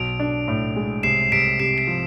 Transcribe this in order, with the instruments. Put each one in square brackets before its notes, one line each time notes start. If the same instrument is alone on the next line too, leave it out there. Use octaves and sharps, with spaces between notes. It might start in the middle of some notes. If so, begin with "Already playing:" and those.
Already playing: [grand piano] B1 [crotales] D7 F7
[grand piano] D4
A2
G#3
[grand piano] C2 [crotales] C7 E7
[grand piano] C2 [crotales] B6 D7
[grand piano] C3 [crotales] C7 E7
[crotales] B6 D7
[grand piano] F3